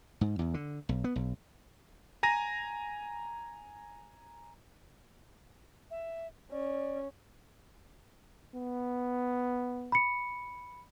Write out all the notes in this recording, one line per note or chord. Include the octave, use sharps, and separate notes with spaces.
G#2
E2
D3
B1
B3
B1
G#5 A#5 A#6 D#7
E5
C#4 D5
B3
B5 C#7